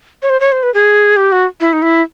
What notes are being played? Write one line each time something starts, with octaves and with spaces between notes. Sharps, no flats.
C#5
C5
C#5
C5
B4
G#4
G4
F#4
E4
D#4
E4